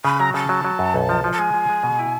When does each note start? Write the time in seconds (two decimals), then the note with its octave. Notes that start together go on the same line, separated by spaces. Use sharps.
0.04 C#3 B5
0.19 F#3 A#5
0.34 C#3 A5
0.49 F#3
0.65 F#3
0.79 F#2
0.94 B1
1.09 F3
1.24 F3
1.32 A5
1.39 G#3 G#5
1.54 F3
1.69 G#3
1.83 B2
1.99 E4